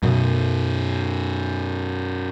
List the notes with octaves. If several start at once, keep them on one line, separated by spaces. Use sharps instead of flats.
F#2 B2 F#3